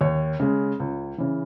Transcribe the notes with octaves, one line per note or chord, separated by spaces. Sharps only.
D#2 C#5
C#3 G#3
C#2
C#3 E3